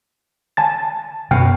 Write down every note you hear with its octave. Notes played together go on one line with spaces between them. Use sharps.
G#5 A5 A6
F#2 B2 G5 F6